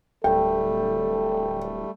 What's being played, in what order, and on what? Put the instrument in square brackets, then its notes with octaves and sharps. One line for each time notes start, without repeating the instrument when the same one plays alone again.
[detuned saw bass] D1 [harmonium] G3 A3 [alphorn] A4 [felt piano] G5